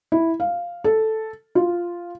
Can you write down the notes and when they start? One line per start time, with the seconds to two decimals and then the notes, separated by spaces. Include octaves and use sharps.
0.12 E4
0.40 F5
0.84 A4
1.55 F4